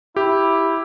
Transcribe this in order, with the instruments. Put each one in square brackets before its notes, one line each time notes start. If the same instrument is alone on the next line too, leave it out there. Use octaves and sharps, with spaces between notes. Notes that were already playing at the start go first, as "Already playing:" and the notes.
[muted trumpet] E4 [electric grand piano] G4